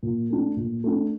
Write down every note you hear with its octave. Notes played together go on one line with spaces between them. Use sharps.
A#2
A3 D4
A#2
A3 D4